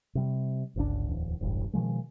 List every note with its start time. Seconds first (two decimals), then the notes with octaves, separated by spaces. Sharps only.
0.15 C3 G3
0.76 G1 C#2 E3 D4
1.08 D1 E2
1.41 E1 A1 G2
1.73 B2 D#3 F3 G#3